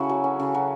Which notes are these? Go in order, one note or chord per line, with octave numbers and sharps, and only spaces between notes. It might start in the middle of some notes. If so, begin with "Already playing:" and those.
Already playing: C#3 E4 F#4 A4
F#3
C#4
C#3
F#3